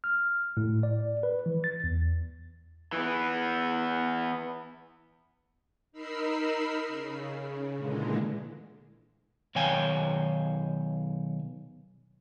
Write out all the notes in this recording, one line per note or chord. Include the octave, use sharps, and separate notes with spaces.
F6
A2
D5
B4
E3
A6
E2
E3 B3
D#4 A#4 B5 E6 C7
C#3
A#2 D3 E3 G#3
B1 D#3 C#5 F5 G5 G#5